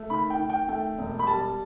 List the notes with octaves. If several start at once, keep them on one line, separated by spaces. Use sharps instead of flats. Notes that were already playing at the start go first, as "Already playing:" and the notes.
Already playing: A3
D#3 B5
G5
D#3
G5
A3 G5
E1
B5
G3 A5